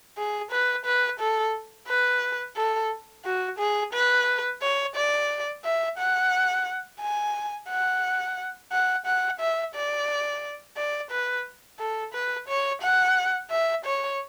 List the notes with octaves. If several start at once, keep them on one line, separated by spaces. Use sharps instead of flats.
G#4
B4
B4
A4
B4
A4
F#4
G#4
B4
C#5
D5
E5
F#5
G#5
F#5
F#5
F#5
E5
D5
D5
B4
A4
B4
C#5
F#5
E5
C#5